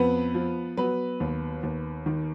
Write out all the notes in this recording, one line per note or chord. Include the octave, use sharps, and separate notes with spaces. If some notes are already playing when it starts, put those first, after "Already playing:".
Already playing: F2 B3 B4
F3
F#3 B3 B4
D#2
D#2
D#3